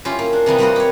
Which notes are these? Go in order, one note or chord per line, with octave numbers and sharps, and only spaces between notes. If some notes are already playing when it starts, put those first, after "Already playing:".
C#4 E4 F4 G4
A#3
D4
C3 E3 G3 B3
G3 A#3 C4 F#4 A#4 D#5
G4 C#5